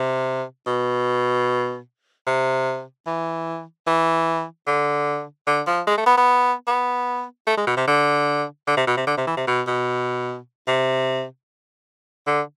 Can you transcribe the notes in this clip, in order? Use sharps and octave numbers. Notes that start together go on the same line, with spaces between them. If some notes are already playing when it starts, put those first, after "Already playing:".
Already playing: C3
B2
C3
E3
E3
D3
D3
F3
G#3
A3
B3
B3
B3
A3
G#3
B2
C3
D3
D3
C3
B2
C3
D3
C3
E3
C3
B2
B2
C3
D3